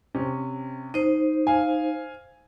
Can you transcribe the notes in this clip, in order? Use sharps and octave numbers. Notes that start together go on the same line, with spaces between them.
C3 C#4
D#4 C5 D#7
F5 G#5